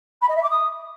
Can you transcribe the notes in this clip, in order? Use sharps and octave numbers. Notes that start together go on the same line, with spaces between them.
B5
D#5
E5
D6
D#6